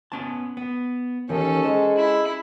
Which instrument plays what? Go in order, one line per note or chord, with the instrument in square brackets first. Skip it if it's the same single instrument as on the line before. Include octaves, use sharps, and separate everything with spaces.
[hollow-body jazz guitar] B3 C#4 A5
B3
[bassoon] D#2 [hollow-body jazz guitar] E3 D#4 [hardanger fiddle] C#4 A4
[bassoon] G#3 [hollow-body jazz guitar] C5
[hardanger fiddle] E4